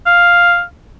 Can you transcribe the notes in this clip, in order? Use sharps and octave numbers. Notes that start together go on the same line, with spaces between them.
F5